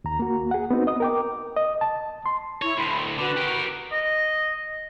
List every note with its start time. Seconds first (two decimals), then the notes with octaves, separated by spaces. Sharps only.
0.04 D#2 A#5
0.19 A#3 F#4
0.51 G#4 F#5
0.71 B3 C4 D#4 F#4
0.87 D#5 D#6
1.00 A#4 G5 D6
1.56 D#5
1.81 A5
2.26 C6
2.62 E4 C#5
2.78 D2 A2 B5 C6
3.18 D3 F#4 B4
3.37 G4 A#4
3.92 D#5